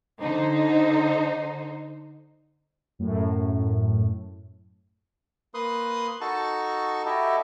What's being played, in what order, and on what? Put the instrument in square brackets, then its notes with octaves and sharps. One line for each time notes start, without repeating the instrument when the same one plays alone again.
[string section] D3 D#4 C5
[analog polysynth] F#2 A2
[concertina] A#3 B4 C6 D#6 F#6
D#4 F#4 A4 A5 C#6
E4 F#4 G4 A4 D#5 E5